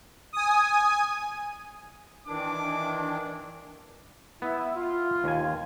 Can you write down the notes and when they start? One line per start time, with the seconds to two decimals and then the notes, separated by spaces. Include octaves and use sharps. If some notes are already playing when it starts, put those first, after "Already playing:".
0.33 G#5 D#6
2.27 D#3 E3 D4 D6
4.42 B3 E4
4.75 F4
5.24 D#2 G#5